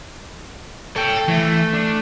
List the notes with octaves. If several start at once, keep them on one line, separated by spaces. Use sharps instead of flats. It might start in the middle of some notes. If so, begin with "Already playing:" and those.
A4 C#5 G5
E3 A3
D4